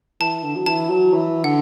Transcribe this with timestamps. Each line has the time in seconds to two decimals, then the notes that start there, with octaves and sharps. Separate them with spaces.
0.20 E3 A5
0.44 D3
0.56 F#3
0.66 E3 A5
0.90 F#3
1.13 E3
1.44 D3 F#5